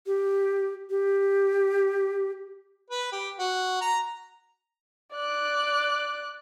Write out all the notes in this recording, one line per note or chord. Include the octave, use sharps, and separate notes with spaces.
G4
G4
B4
G4
F#4
A#5
D5 F#6